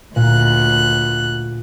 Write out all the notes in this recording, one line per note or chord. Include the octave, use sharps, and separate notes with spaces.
D2 A#2 F#6